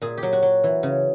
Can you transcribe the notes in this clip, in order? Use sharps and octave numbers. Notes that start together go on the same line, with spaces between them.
A#2 G#4
G4
F#3
F#4
F#3
E3
C#3